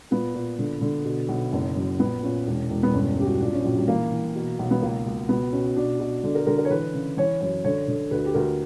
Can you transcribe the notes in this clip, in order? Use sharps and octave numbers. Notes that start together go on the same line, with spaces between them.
A#2 B3
A#2
D3
D3
B2
B1
F#1 C#4
F#2
A#1 B3
A#2 C#4
E1
E1
B3
G1 C#4
C#3 G4
F#4
A#2 D4
C#4
A#1 F#3
G3
E3 A#3
E3
B2
B1
B3
C#2 A#3
C#2
B2 B3
B2 C#4
B2 D4
B2
D3 D4
A#4
D3 A#4
A#4
C#5
E3 B4
C#3
E3 C#5
F#2 C#5
D3 C#5
D3
D2 B4
G4
D2 A#4